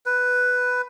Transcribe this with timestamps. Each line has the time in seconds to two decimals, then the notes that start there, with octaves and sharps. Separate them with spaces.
0.06 B4